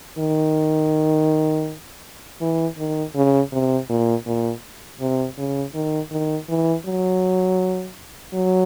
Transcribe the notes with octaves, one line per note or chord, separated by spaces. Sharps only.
D#3
E3
D#3
C#3
C3
A#2
A#2
C3
C#3
D#3
D#3
E3
F#3
F#3